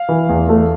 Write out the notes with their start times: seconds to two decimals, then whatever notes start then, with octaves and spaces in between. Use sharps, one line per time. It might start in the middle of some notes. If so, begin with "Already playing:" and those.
Already playing: F5
0.09 E3
0.29 E2
0.49 A3